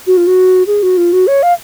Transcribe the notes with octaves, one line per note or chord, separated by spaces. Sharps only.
F#4
F4
F#4
G#4
F#4
F4
F#4
C#5
F5